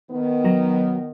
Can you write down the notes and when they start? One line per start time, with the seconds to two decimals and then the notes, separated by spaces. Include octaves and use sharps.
0.11 D#3 B3
0.44 F#3 A#5